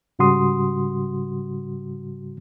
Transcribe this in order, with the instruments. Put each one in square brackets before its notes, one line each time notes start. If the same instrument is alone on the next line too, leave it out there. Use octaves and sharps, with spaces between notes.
[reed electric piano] G#2 C#3 G3 F#4 C6 D#6